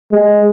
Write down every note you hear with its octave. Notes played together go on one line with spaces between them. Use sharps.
G#3